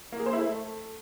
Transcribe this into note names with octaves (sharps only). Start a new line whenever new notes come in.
A#3
G#4
C5
E4
A3